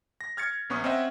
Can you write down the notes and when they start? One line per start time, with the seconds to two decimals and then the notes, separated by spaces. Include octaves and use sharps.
0.21 A#6
0.37 F6 G#6 A6 C#7
0.70 A#1 B3 C#4 C#6 D#6
0.84 C4 C#4 D#5 E5 F#5